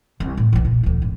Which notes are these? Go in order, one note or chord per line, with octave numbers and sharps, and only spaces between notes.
C2
A2
B1 E3
E2 A#2
D2 E3
G#1